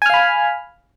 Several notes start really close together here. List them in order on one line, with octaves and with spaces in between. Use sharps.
G#5 F6 F5 B5